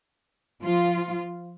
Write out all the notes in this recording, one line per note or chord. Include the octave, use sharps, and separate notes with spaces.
F3 F4